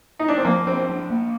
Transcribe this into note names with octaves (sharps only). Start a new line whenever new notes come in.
D#4
D4
C4
F3 A#3
C4 D4
D4
A#3